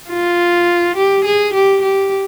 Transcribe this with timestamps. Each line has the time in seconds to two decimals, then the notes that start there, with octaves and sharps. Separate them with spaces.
0.09 F4
0.96 G4
1.25 G#4
1.54 G4
1.82 G4